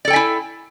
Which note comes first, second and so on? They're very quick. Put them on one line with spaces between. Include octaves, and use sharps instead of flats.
D5 A4 G5 G#5 E4